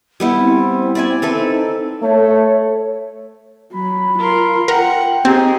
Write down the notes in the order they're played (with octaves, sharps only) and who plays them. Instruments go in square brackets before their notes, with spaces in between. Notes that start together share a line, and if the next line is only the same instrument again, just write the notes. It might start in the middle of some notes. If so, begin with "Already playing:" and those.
[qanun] G3 B3 E4
[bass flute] C4
[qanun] D5 E5 G#5
[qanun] C4 A4 B4 [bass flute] E5
[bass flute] D#4
[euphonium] A3 [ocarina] C#5
[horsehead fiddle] F#3 [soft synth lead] B5
[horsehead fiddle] F4 [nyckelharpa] A#4 C6
[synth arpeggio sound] A#4 [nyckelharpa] F#5 [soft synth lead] G5
[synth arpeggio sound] C4 [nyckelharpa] D#4 G#4 [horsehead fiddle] G4